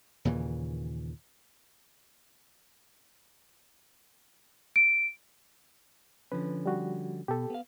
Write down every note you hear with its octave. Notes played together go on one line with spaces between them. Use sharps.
D#2 A#2 C#3 E3
D7
D3 F3 C#4 B4
G3 F#4
B2 G4 A4
B3 F5